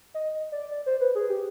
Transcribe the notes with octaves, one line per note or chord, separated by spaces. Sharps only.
D#5
D5
D5
C5
B4
G#4
G4